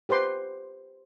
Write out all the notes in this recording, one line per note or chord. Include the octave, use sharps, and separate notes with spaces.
G4 B4 C5 C6 D6